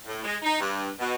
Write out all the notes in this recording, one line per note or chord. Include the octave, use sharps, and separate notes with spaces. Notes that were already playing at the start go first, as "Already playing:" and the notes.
A2
G#3
D#4
G2
B2